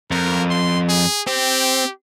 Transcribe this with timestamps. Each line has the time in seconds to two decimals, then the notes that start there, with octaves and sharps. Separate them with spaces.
0.11 F2 A#4
0.50 C6
0.89 G#4
1.27 C4 G4